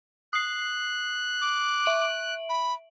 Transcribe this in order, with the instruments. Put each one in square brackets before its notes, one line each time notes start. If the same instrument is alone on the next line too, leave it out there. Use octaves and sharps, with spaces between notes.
[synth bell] D#6 C7 [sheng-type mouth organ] F#6
[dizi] D6
[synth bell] E5 D7 F#7
[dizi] B5